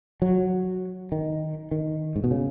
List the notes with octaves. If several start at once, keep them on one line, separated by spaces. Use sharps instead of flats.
F#3
D#3
D#3
G#2
B2
C#3